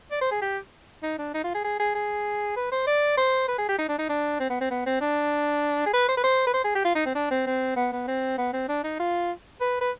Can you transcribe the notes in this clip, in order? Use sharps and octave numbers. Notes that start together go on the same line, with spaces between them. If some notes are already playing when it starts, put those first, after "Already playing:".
D5
C5
G#4
G4
D#4
D4
D#4
F4
G#4
G#4
G#4
G#4
B4
C5
D5
C5
B4
G#4
G4
D#4
D4
D#4
D4
C4
B3
C4
B3
C4
D4
G#4
B4
C5
B4
C5
B4
C5
G#4
G4
F4
D#4
C4
D4
C4
C4
B3
B3
C4
B3
C4
D4
D#4
F4
B4
B4